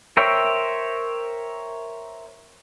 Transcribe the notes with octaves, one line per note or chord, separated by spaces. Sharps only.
A#4 C5 C#5 E5 G5